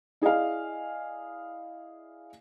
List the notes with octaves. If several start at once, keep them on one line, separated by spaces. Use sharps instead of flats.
E4 G#4 D5 D#5 F5